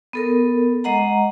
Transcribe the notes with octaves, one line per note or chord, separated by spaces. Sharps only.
B3 A4 A#4
G#3 D#5 F#5 A#5